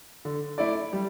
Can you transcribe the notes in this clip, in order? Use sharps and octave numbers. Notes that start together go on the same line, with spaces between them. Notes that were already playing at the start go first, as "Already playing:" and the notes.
D3
A3 E4 A4 D5
G3